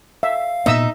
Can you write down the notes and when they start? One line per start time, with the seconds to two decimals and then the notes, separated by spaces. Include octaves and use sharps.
0.23 E5 F5
0.66 A#2 B3 D#4 E5 D#6 E6